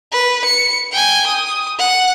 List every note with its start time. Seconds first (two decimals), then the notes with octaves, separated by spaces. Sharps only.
0.12 B4
0.45 C#7
0.92 G5 G#5
1.27 D#6
1.79 F#5